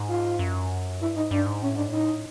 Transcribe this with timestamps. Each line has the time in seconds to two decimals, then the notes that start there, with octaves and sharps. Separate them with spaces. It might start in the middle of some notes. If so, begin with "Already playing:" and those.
Already playing: G#2
0.08 F4
0.39 F#2
1.01 G2 E4
1.16 G#2 D#4
1.31 G2 D4
1.46 G#2
1.62 A2 C#4
1.75 G#2 D4
1.88 A2 D#4